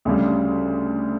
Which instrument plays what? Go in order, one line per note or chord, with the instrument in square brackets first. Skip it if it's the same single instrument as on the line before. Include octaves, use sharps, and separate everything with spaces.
[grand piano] D2 C#3 G3